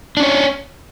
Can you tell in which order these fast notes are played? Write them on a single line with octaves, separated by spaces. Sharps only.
D4 C#4 C#5